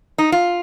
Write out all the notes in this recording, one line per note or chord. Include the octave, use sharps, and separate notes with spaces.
D#4
F4